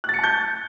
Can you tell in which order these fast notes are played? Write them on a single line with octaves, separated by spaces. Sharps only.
F#6 A6 C#7 A5 G6